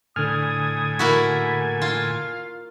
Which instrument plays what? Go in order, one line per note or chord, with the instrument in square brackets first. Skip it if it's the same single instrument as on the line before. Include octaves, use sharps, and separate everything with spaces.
[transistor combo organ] A2 G#5 [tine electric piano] D3 F6 [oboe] D#6
[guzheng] A#3 E4 F#4 [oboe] B5
[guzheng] F4 [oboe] F5